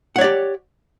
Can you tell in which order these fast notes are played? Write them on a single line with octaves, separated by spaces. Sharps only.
F#5 C#5 D5 G4